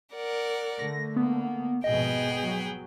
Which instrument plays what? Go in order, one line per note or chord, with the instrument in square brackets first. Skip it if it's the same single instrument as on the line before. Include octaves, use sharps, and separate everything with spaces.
[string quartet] A#4 D5 F#5
[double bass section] D3 A3 [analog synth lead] A#6
[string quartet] A#3 [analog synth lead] B3
[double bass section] G#1 F2 B2 [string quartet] B3 G#4 G5 [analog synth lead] D#5
[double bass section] F#3